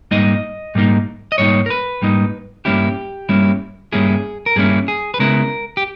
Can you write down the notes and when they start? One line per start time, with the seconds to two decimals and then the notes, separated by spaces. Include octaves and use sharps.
0.11 G#2 G3 A#3 D#4 D#5
0.75 G#2 G3 A#3 D#4
1.32 D#5
1.38 G#2 G3 A#3 D#4 C#5
1.66 A#4
1.70 B4
2.02 G#2 G3 A#3 D#4
2.65 G2 G3 A#3 C#4 E4 G4
3.29 G2 G3 A#3 C#4 E4
3.92 G2 G3 A#3 C#4 E4 G#4
4.46 A#4
4.56 G2 G3 A#3 C#4 E4 G#4
4.88 G#4
5.14 B4
5.19 C#3 G#3 B3 E4 A#4
5.77 G4